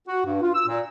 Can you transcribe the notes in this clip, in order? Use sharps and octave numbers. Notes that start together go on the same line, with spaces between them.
F#4
G2
F4
E6
A#2